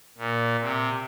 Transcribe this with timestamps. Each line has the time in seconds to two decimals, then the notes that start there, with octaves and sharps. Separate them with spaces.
0.18 A#2
0.62 C3